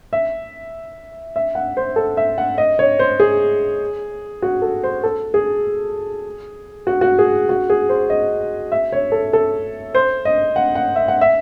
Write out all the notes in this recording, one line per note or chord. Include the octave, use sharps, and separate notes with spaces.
E5
E5
F#5
C5
A4
E5
F#5
D#5
C#5
C5
G#4
F#4
A4
C5
A4
G#4
F#4
F#4
G#4
F#4
G#4
C5
D#5
E5
C#5
A4
A4
C5
D#5
F#5
F#5
E5
F#5
E5